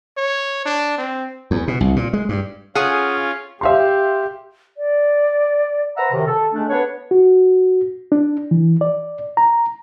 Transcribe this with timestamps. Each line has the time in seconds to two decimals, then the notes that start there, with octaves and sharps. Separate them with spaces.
0.17 C#5
0.66 D4
0.98 C4
1.51 E2
1.68 B2
1.81 C2
1.96 A#2
2.13 G#3
2.29 G2
2.76 C#4 F4 G#4 F5 F#5 D#6
3.61 G4 E5 F5 C6
4.77 D5
5.97 B4 C5 E5 F#5 A#5
6.13 F#2 C3 D#3
6.27 A4
6.54 D3 G#3 A3 D4
6.69 B3 D4 C#5
7.11 F#4
8.12 D4
8.51 E3
8.81 D5
9.37 A#5